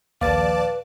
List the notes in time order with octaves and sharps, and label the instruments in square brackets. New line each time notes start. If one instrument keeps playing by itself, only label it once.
[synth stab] A#1 D#2 [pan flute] B4 [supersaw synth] D5 A5 D6 [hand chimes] F5 A6